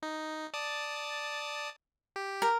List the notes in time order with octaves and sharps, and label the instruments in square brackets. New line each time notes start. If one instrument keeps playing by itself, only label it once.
[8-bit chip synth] D#4
D5 A5 D#6
G4
[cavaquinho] A#4